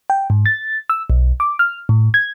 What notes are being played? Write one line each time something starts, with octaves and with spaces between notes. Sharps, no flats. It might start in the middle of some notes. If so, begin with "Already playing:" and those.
G5
G#2
A6
E6
B1
D6
F6
A2
G#6